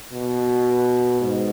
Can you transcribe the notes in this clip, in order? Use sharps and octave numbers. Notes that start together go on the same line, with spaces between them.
B2
G#2